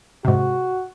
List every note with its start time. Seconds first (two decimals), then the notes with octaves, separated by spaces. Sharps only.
0.25 G#2 C3 F#4